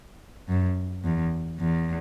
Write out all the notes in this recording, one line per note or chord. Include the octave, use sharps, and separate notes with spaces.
F#2
E2
E2